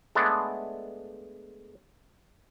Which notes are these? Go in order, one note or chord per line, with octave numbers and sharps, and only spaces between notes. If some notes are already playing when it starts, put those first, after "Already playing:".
G#3 A3 B3 D4